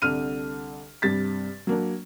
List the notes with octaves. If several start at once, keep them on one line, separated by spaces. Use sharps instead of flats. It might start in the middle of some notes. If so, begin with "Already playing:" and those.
C2 D3 F6 D#7
G2 C3 G3 A6 B6
F#3 A#3 D4